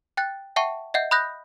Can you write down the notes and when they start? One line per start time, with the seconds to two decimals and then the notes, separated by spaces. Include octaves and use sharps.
0.17 G5 F#6 A6
0.56 E5 F#5 G5 A5 C#6
0.94 D#5 E5 F#5 G6
1.11 B5 D#6 F#6 G6 A#6